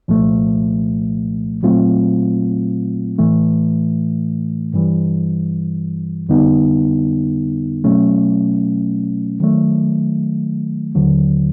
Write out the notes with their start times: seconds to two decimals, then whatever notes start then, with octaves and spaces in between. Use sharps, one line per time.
0.08 C2 A#2 F3 A3
1.63 A#2 F#3 A3 C4 F4
3.19 A2 E3 A3
4.74 G2 E3 G3
6.29 F2 D3 G3 B3 D#4
7.84 B2 F#3 A3 C#4
9.40 D#3 F#3 A3
10.95 D#2 D3 F#3